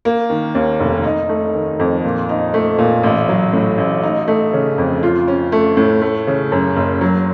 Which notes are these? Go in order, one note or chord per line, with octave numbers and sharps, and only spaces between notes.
A#3
D#3
D#2
F1
D#4
A3
D#3
F2
A#2
D#4
A3
A#2
A1
F#3
A2
A1
D#4
A3
C#3
F2
F4
C#4
A3
A2
A3
C#3
F#2
F#1
F#3